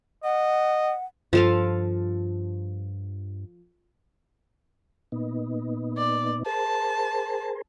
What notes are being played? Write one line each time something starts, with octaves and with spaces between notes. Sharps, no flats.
D#5 F#5
G2 F3 A4 F5
A#2 B3 D#4
D5
G#4 A#4 C5 A5